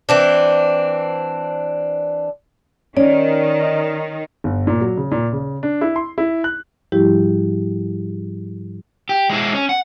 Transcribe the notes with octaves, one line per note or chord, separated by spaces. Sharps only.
E3 C4 D4
D#3 C#4 D5
G1
A#2
F#3
C#3
A#2
C#3
D4
E4
C6
E4
F#6
G#2 F3 G3 E4 G4
G4
G#3 E4
C#4
F#5